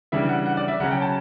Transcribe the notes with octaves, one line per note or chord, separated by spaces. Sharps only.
C#3 E3 G3 D4 E5
F#5
F#5
D5
E5
C#3 F#3 C#4 F#5
G5
A5